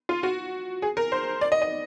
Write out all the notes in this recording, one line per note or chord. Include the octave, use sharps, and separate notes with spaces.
F4
F#4
G#4
A#4
C5
D5
D#5
D#5